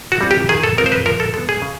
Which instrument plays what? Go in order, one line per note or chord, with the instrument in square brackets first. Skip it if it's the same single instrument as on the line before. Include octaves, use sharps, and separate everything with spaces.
[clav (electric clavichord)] F#4
G3 C4 F4
G4
D#3 G#4
A4
G#3 C4 F4 A#4
C5
B4
F3 A#4
A4
G#3 B3 A4
G#4
C#3